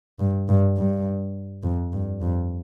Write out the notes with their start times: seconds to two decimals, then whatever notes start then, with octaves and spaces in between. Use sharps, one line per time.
0.19 G2
0.49 G2
0.77 G2
1.63 F2
1.93 G2
2.22 F2